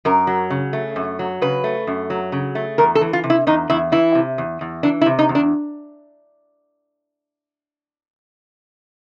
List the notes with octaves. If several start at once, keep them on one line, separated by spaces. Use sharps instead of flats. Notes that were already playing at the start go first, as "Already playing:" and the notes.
F#2 A#4
F#3
C#3
A3
F#2
F#3
C#3 B4
A3
F#2
F#3
C#3
A3
E2 A#4
A4
E3
F4
C3
E4
E2 D#4
E2 E4
E3 E4
C3
E2
E2
E3 D4
E4
C3
D#4
E2
D4